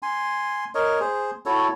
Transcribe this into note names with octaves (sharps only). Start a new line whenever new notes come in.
G#5 C6
A#4 C#5 D#5
G#4 C5
E4 F#4 A4 C#5